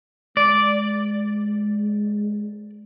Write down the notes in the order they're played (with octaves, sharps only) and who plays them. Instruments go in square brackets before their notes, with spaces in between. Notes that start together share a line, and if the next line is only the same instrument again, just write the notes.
[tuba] G#3 [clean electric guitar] D5